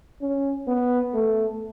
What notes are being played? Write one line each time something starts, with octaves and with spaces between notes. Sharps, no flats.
C#4
B3
A3